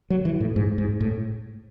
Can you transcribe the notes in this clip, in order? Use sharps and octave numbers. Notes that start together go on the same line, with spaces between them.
F#3
E3
A2
G#2
G#2
A2